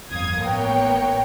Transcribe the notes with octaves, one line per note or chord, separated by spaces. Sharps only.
G1 F2 F5 D#6 G#6
A1 A#3 B3 A#4 C#5 G5